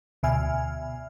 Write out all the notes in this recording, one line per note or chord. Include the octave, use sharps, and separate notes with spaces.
D2 B2 E5 G#5 F6